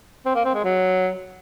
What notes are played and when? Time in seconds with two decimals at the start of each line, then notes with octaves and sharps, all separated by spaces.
0.25 C4
0.35 A#3
0.45 C4
0.55 G#3
0.64 F#3